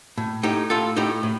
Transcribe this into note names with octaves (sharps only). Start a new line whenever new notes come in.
A2
A2 D#4 G4
A2 F4 A4
A2 D#4 G4
A2